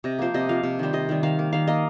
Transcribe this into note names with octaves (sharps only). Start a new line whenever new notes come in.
C3 D#5
F3 A#3 C5
C3 D#5
F3 A#3 F5
C3
D#3 G3 C5
C3 D#5
D#3 G3
D#3 F5
A#3
D#3 F5
A#3 D#5